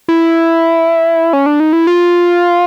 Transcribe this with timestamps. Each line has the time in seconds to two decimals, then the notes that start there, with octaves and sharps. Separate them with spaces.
0.08 E4
1.33 C#4
1.46 D4
1.60 D#4
1.73 E4
1.87 F4